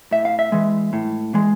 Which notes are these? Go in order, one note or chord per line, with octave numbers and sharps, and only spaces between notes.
A2 E5
F5
E5
E3 G#3
A2
E3 G#3